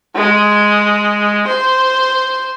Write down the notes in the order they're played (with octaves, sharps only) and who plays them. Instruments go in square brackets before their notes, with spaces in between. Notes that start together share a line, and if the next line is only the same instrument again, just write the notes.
[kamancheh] G#3
C5